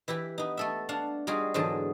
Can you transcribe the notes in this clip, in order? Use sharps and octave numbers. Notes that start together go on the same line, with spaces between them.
E3 E4 G4 B4
B3 D#4
A3 A4 E5
D4 F5 F#5 A5
G3 D#4 F4 F#4 G#4
E2 G#2 D3 F#3 G#4 A5